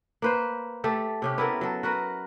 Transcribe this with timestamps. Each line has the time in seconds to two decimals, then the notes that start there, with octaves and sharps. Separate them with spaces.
0.22 A#3 B4 C5
0.84 A3 G4 A4
1.22 C3 C#4 G4
1.38 B3 E4 A4 A#4
1.61 F#3 A4
1.83 F#4 A#4 B4